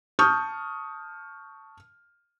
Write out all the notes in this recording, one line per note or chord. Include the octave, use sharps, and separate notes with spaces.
A5 C#6 D#6 F6 G6